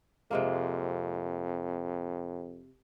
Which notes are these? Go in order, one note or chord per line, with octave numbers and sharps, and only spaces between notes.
F2 C3 G#3 A#3